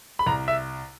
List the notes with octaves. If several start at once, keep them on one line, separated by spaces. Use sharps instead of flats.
B5
C2 A#5
E5